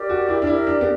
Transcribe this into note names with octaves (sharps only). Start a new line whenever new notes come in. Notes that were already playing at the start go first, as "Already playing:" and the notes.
Already playing: G4 A#4 D5
F#4
E4
D4
E4 G4 A#4 D5
D4
B3